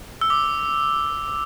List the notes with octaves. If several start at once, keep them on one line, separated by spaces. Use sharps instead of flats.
E6
D6